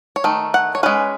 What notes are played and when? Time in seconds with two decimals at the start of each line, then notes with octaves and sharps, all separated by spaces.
0.16 C#5
0.24 D#3 A3
0.54 F#5
0.75 C#5
0.83 G#3 C#4 B4